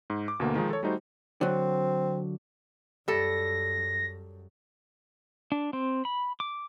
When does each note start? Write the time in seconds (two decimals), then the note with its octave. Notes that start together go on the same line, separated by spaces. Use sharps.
0.10 G#2
0.28 D6
0.40 D2 B2 D3 A#3
0.55 D#3 F3 G#3 D#4 F4
0.70 A4 C#5
0.83 G3 A3 D#4 F#4 C5
1.41 D3 F#3 C4
3.08 F#2 G3 A4 A#6
5.52 D4
5.73 C4
6.05 B5
6.40 D6